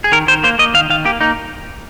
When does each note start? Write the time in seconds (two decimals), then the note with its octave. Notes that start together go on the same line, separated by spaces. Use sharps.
0.04 G#4
0.12 D#3 A#4
0.27 D#3 C5
0.43 A#3 C5
0.59 A#3 D#5
0.74 D#3 F5
0.90 D#3 F5
1.05 A#3 G4
1.21 A#3 D#4